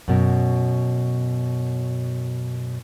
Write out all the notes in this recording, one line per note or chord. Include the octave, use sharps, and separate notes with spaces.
F#2 B2